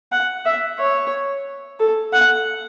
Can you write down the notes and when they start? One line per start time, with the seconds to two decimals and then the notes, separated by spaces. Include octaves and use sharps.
0.12 F#5
0.45 E5
0.79 C#5
1.80 A4
2.13 F#5